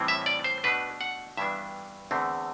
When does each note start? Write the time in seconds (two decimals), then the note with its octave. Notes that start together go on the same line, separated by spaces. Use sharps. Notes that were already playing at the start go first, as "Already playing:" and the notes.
Already playing: A2 E3 G3 C4
0.08 E5
0.26 D5
0.44 C5
0.64 B2 A3 D4 B4
1.01 F#5
1.37 G2 E3 G3 B3 D4 E5
2.11 E2 D3 A3 C4